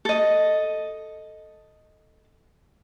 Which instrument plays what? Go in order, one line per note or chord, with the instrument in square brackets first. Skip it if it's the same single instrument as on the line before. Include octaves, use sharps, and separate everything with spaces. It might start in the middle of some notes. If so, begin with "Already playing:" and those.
[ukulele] A4 D#5